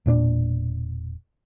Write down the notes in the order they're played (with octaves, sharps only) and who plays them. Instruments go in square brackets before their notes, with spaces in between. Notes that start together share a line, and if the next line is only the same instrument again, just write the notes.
[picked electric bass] E1 A#2 C#4 D4